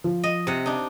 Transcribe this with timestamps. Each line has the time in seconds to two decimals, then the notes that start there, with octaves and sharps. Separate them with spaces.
0.04 F3
0.23 D#5
0.47 C3 F#5 D#7
0.66 D4 D#4